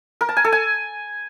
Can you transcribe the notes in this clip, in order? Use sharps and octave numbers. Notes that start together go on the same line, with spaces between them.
A#4
A5
G#5
A4
G#5